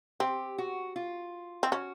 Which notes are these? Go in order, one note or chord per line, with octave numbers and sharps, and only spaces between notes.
C4 G4
F#4
F4
C4
C#4 F#4